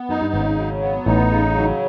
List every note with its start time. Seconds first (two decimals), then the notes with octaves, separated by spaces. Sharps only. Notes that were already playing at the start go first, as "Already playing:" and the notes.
Already playing: B3
0.09 F#2 D#4
0.21 G2
0.34 G#1 G#2 C#3
0.58 F#3
0.82 B3
1.06 A1 A2 D#4
1.31 C#3
1.55 F#3